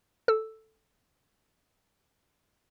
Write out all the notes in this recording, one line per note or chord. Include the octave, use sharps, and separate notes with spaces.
A4 E6